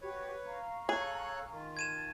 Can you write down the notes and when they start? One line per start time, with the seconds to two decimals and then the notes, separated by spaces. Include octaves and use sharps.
0.01 F#4 G4 B4 C#5 C#6
0.46 F5 A#5 C#6
0.89 G#4 A4 C#5 F#6
1.52 D#3 F4
1.77 A5 G#6 D#7 E7